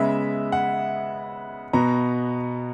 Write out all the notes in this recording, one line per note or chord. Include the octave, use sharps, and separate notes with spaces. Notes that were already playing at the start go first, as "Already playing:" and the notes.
Already playing: C#3 G#3 B3 E5
F#5
B2 B3 A#5